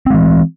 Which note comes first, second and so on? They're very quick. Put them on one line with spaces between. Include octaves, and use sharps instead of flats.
C4 G#3 E3